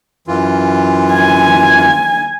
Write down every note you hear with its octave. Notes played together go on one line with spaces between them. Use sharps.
F#2 E3 F4
G#5